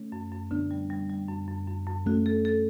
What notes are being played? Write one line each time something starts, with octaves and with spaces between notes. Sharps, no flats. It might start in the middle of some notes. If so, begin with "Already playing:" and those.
Already playing: A3 C#4
F#2
F#2
D3 B3 D4
G3
G3
G3
F#2
F#2
F#2
F#2
A3 C#4 F#4
A4
A4